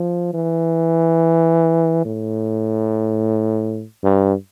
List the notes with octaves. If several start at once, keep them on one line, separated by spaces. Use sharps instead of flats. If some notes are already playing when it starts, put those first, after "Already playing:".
Already playing: F3
E3
A2
G2